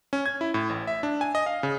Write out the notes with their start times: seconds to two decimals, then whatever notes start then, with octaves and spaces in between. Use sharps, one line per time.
0.13 C#4
0.26 G#6
0.41 E4
0.54 A2
0.70 A1
0.87 E5
1.03 D4
1.21 G#5
1.35 D#5
1.46 F5
1.63 C#3